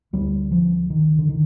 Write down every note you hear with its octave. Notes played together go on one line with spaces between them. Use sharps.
D2 D3 G3
F3
D#3
D3
D#3